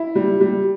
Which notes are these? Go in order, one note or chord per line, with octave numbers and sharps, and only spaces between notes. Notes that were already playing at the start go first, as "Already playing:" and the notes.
Already playing: E4
G3
G3